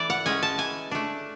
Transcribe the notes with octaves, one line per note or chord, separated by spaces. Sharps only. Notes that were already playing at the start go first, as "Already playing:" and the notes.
Already playing: E3 A3 D5
F#5
G#3 C#4 G#5
A5
E3 G#5
A3 D4